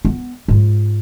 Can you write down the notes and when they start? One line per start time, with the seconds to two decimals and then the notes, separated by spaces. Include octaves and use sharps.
0.05 B3
0.48 G#2 F4